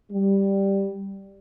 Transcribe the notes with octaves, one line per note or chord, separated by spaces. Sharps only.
G3